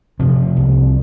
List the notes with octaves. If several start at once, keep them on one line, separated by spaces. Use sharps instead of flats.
C3 F3
C2